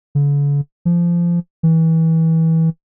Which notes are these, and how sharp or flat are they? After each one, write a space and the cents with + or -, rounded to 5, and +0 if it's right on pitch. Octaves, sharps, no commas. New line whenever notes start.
D3 -45
F3 -20
E3 -25